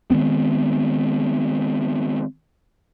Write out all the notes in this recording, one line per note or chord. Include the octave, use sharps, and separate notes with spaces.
D#3 G#3 B3 C4